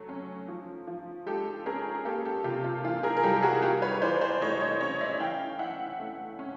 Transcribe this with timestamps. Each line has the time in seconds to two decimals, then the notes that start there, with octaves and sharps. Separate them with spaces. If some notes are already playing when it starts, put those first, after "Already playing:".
Already playing: F#3 A3
0.09 C#4
0.48 F3
0.87 F3
1.26 G#3 G4 A4
1.66 C#4 G#4 A#4
2.05 A#3 G4 A4
2.25 G4 A4
2.44 C3 F4 G4
2.64 F4
2.84 E3 F4
3.03 G#4 A#4
3.17 A#4
3.23 G3 G4 A4
3.36 G4
3.43 F#4 G#4
3.62 F4 G4
3.82 B4 C#5
4.02 E3 C5 D5
4.21 C5 D5
4.42 A3 C#5 D#5
4.61 C#5 D#5
4.80 C#4 C#5 D#5
5.01 D5 E5
5.20 E3 F5 G5
5.59 E3 E5 F#5
6.00 A3
6.39 C#4